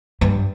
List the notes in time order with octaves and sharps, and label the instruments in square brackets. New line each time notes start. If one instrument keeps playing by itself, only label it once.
[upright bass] G2